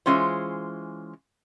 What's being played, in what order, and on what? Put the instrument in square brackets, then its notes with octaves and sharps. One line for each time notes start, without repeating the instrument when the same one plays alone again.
[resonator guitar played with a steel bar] E3 G#3 C#4 F4 C5